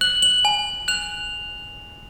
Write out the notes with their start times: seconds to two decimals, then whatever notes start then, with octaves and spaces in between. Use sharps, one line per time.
0.01 F#6 F#7
0.22 F#7
0.45 G#5
0.88 F#6 F7